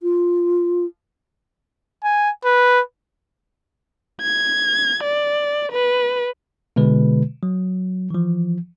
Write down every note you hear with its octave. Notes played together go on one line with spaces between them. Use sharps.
F4
G#5
B4
G#6
D5
B4
B2 D3 G#3 B4
F#3
E3 F3